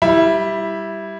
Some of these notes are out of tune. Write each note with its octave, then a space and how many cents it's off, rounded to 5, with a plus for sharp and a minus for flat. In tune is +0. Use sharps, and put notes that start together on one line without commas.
G3 +0 E4 +0